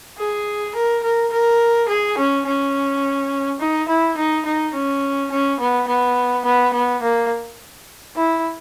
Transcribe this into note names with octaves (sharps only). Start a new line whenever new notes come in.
G#4
A#4
A#4
A#4
G#4
C#4
C#4
D#4
E4
D#4
D#4
C#4
C#4
B3
B3
B3
B3
A#3
E4